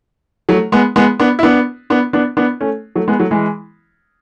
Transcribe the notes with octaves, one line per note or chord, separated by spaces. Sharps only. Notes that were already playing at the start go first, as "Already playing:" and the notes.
F#3 A3
G#3 B3
G#3 B3
B3 D4
E4
B3 D4
B3 D4
B3 D4
B3 D4
A3 C#4
F#3 A3
G#3 B3
F#3 A3
E3 G#3